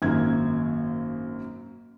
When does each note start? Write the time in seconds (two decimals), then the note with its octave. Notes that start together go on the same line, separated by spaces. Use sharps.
0.02 G#1 F#2 A#3 G#6